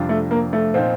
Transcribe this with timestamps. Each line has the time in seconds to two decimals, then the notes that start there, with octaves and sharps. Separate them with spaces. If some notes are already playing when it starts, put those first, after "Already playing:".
Already playing: F2 C3 G3 D4 F4
0.09 A3
0.31 A#3
0.53 A3
0.74 A#2 F3 C4 D#4